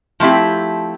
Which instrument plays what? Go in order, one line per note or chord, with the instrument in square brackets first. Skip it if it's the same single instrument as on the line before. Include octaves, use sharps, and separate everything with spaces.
[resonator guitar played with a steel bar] F3 A3 C4 E4 G4